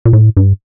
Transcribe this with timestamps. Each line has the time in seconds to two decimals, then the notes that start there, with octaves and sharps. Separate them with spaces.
0.05 A#2
0.13 A2
0.37 G2